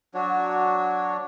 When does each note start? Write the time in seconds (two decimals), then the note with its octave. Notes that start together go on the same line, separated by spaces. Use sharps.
0.15 F#3 D4 F#4 C#5